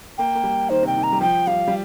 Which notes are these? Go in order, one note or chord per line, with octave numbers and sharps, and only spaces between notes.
A#3 G5
A#3
G3
D#3 C5
C3 G5
D#3
A#5
G3
F3 G5
G3 F5
G3